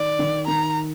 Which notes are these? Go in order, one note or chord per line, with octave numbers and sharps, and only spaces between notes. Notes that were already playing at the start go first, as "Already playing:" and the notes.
Already playing: D#3 D5
D#3
D#3 A#5